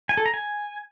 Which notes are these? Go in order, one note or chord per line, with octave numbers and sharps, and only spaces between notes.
G#5
A4
A#5
G#5